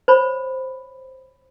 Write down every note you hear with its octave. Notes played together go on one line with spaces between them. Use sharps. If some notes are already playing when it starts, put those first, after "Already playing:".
C5 C#5 B5